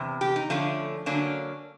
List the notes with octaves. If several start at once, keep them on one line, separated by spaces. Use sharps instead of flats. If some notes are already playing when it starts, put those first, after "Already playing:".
Already playing: E2 C3
G4
D#4
D3 F3 A3 C#4 D4
D3 F#3 A#3 C#4 D4